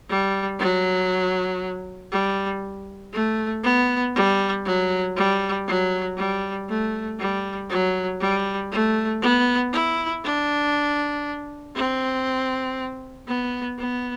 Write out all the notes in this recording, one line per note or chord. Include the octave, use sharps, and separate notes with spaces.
G3
F#3
G3
A3
B3
G3
F#3
G3
F#3
G3
A3
G3
F#3
G3
A3
B3
E4
D4
C4
B3
B3